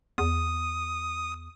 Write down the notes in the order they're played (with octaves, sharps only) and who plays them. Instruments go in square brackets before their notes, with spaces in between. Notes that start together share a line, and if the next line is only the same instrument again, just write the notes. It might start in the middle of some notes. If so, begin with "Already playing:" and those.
[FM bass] E2 [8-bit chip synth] D#6